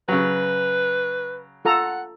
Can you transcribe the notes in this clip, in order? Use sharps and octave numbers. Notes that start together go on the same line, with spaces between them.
C#3 F#3 B4
F4 A4 F#5 A#5